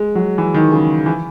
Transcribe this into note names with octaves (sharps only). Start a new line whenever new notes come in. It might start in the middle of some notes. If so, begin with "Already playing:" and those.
Already playing: G#3
F#3
E3
D#3
C#3
E3